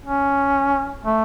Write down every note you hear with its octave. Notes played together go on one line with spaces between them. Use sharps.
C#4
A3